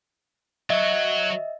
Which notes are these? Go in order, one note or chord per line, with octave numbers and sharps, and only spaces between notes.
F#3 F#4 D#5 E5